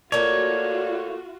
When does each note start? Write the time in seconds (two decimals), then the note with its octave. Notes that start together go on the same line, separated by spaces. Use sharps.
0.12 A3 A#3 F4 F#4 C#5 D5